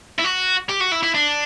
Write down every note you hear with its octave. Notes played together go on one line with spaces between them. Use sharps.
E4
F#4
G4
F#4
E4
E4
D4